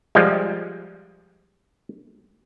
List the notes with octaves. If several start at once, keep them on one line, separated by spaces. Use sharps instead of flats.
F3 G3 G#3